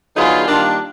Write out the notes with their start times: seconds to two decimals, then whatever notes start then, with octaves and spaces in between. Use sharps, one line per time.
0.17 D3 F#3 B3 D#4 F4 G#4
0.48 D#3 G3 A#3 D4